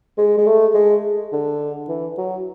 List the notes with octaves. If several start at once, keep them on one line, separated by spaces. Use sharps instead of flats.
G#3
G#3
A3
G#3
D3
E3
F#3